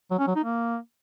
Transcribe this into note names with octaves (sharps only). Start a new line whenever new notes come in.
F#3
C#4
F#3
D#4
A#3